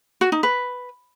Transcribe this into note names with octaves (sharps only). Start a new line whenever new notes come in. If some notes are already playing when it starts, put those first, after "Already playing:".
F#4
D#4
B4